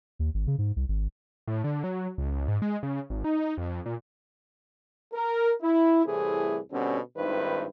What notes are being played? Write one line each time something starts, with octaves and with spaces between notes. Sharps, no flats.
D#2
G#1
C#3
G#2
C2
G#1
A2
D3
F#3
C#2
G#2
G#3
C#3
G#1
D#4
F2
A#2
A#4
E4
C2 A2 C3 E3 A3 G#4
B2 D3 G3 C4 C#4
G#1 G2 D#3 E4 B4 C5